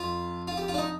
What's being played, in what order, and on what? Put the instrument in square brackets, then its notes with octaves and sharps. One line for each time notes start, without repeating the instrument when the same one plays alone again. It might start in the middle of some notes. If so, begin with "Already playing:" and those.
Already playing: [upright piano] F2 [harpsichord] F4
[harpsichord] F4
G4
F4
D4
D#4